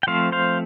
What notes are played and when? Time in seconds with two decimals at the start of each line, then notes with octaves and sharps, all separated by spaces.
0.03 G5
0.07 F3 A3 C4 C5 F5
0.32 C5 F5